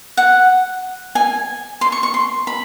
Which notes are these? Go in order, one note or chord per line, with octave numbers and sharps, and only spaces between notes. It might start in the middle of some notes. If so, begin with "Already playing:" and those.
F#5
G#5
C6
C#6
C#6
C6
B5